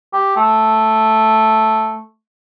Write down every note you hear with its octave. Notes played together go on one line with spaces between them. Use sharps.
G4
A3